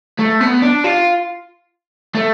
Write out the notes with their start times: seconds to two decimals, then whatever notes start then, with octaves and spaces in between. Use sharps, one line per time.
0.19 A3
0.41 B3
0.62 D4
0.84 F4
2.15 A3